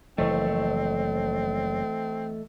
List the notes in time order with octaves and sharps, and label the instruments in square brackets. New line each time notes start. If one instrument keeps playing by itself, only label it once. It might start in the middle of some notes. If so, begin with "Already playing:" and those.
[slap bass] F#1 F3 [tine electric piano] E3 D#5 [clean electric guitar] A3 [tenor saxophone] C4